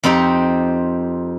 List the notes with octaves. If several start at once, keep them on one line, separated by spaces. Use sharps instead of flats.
F2 C4 D#4 G4